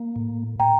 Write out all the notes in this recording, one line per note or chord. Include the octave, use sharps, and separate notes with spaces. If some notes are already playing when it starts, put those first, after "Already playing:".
Already playing: A#3
A2
A2 G5 A#5